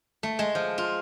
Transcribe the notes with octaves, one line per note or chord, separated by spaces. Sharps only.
A3
G#3
F3
F4